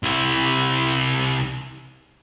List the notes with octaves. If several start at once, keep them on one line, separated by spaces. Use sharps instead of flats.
C2 E4